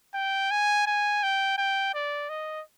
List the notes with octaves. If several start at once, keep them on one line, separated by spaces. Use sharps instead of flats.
G5
G#5
G#5
G5
G5
D5
D#5